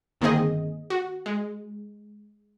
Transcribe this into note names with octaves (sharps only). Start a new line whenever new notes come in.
G1 D#3 A#3 C4 G#4 D#5
F#4
G#3